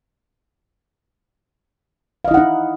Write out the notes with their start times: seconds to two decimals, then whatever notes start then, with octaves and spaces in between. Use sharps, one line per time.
2.25 F5
2.28 D#5
2.31 E4
2.34 F#5
2.37 D#4